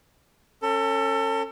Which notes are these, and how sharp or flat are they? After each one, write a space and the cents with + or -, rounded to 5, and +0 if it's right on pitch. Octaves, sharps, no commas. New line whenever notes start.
C#4 -20 A4 +30